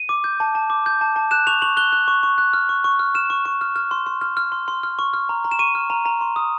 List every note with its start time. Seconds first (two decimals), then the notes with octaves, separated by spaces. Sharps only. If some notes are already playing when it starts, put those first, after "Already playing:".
Already playing: D#7
0.09 D6
0.24 G6
0.40 A5
0.55 A5
0.70 D6
0.86 G6
1.01 A5
1.16 A5
1.31 F#6 E7
1.47 C#6 F7
1.62 C#6 F#7
1.77 F#6 G7
1.92 F#6
2.08 C#6
2.23 C#6
2.38 F#6
2.53 F6
2.69 C#6
2.84 C#6
2.99 F6
3.14 F6 E7
3.30 C#6
3.45 C#6
3.61 F6
3.76 F6
3.91 C6
4.06 C6
4.21 F6
4.37 F6
4.52 C6
4.68 C6
4.83 F6
4.99 C#6
5.14 F6
5.29 A#5
5.45 A#5
5.51 E7
5.59 C#6 D#7
5.75 F6
5.90 A#5
6.05 A#5
6.21 C6
6.36 D#6